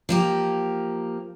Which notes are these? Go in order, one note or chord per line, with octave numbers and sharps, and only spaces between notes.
F3 A#3 G4